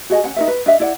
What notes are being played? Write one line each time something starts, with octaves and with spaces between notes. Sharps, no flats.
F#4 G#4 D#5 G#5
C#4 C#5 F#5 G#5
D#4 A#4 E5
B4
D4 D#5 E5
E4 D5 F#5